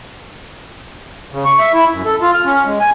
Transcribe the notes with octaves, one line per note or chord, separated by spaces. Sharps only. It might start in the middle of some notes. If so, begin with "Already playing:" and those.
C#3
C#6
E5
E4
F#2
A4
F4
F6
C#4
G#3
G#5